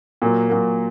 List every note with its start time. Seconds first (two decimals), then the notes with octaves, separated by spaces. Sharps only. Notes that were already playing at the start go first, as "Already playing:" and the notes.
0.22 A#2 F#3 A#3
0.49 A#2 F#3 A#3